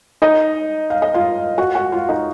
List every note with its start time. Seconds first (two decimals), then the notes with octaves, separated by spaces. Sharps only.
0.22 D#4 D#5
0.90 F5
1.02 D#5
1.14 F4 F5
1.58 F#4 F#5
1.75 F#4 F#5
1.92 F4 F5
2.09 D#4 D#5